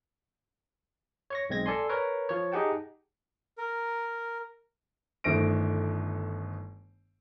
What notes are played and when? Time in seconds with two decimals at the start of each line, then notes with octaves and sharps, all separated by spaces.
1.30 C#5 C#6 A#6
1.50 B1 G#3 C4 G#6 A#6
1.66 A4 D5 G#5 C6
1.89 A#4 B4 C#5
2.29 F3 C#5
2.52 D#4 G4 G#4 F#5 G5 A5
3.58 A#4
5.24 G1 D#3 A3 C5 A#6 D7